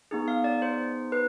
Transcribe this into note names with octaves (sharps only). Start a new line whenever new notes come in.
B3 D#4 G#4
F5
D5
C5
B4